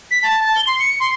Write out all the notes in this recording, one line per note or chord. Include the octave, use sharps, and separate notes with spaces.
B6
A5
A5
G7
C6
C#7
C6